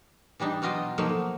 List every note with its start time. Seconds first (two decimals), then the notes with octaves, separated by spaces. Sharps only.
0.40 E3 G3 D4 D#4
0.62 B2 F#3 F4 D#5 F5 G5
0.98 F3 F#3 A3 A#3 D#4